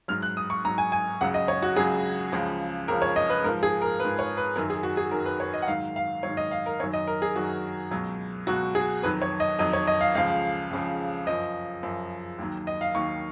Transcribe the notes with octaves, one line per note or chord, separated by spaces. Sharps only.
G#2 F#3 F6
F#6
D#6
C#6
G#2 F#3 A#5
G#5
G#5
C#2 C#3 F#3 F#5
D#5
C#5
F#4
C#2 C#3 F#3 G#4
C#2 C#3 F3
C#2 C#3 F3 A#4
C#5
D#5
B4
G#2 F3 A#4
G#4
A#4
F3 B4
G#2
C#5
B4
F#2 D#3 F#3 A#4
G#4
F#4
G#4
F#2 D#3 F#3 A#4
B4
C#5
D#5
F#5
G#2 D#3 F#3 F5
F5
G#2 D#3 F#3 C#5
D#5
F5
A#4
F#2 D#3 F#3 C#5
D#5
A#4
G#4
F#2 D#3 F#3 F#4
C#2 B2 F#3
C#2 B2 F#3 F#4
G#4
F2 D#3 F#3 B4
C#5
D#5
F2 D#3 F#3 D#5
C#5
D#5
F5
C#2 C#3 F3 F5
C#2 C#3 F3
F#2 F3 D#5
F#2 F3
D#2 D#3 F#3
D#5
F5
D#2 D#3 F#3 C#6